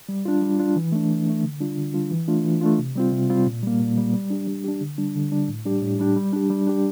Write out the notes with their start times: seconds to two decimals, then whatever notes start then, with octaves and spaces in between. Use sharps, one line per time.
0.09 G3
0.25 D4 F4
0.42 G3
0.59 D4 F4
0.76 E3
0.92 A3 D4
1.10 E3
1.27 A3 D4
1.43 D3
1.60 G3 D4 F4
1.78 D3
1.94 G3 D4 F4
2.11 E3
2.28 A3 D4 F4
2.44 E3
2.61 A3 D4 F4
2.78 C3
2.95 G3 C4 F4
3.12 C3
3.29 G3 C4 F4
3.46 A#2
3.63 G3 A#3
3.80 A#2
3.97 G3 A#3
4.14 G3
4.30 D4 G4
4.47 G3
4.64 D4 G4
4.81 D3
4.98 G3 D4
5.15 D3
5.32 G3 D4
5.48 A2
5.65 G3 D4 G4
5.82 A2
5.99 G3 D4 G4
6.16 G3
6.33 D4 G4
6.50 G3
6.67 D4 G4